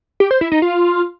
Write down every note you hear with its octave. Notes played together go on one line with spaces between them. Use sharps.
G4
C5
E4
D#4
F4